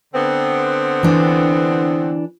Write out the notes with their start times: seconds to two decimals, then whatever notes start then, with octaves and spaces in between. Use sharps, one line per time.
0.14 D3 B3 C4
1.03 E3 D4